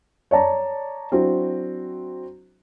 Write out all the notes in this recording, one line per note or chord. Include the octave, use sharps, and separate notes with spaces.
C#5 D5 A5 A#5
F#3 C4 D4 E4 F#4